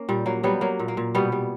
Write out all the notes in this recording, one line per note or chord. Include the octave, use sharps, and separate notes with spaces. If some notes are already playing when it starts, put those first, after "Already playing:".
Already playing: A#3 C#4
A#2 G3
F#3 A#3
F#3 G3 B3
F#3 A#3
A#2
A#3
A#2
B2 G3 B3
G3